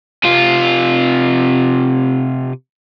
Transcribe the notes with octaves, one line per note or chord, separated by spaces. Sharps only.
C3 F4